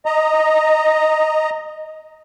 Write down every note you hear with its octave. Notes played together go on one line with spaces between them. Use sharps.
D#5 A#5